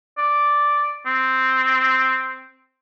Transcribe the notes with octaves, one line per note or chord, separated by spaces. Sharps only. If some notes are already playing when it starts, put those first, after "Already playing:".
D5
C4